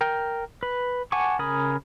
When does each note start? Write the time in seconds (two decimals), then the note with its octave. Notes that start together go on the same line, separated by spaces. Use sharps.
0.01 A#4 G5
0.63 B4
1.12 F#5 G#5 A5 C#6 D6
1.39 C#3 A#4 G#5 B5 D#6